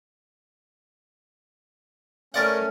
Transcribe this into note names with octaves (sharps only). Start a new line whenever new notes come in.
A3 C#4 A#4 D5 F#5